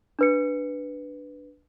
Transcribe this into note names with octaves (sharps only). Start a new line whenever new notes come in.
D4 B4 C#7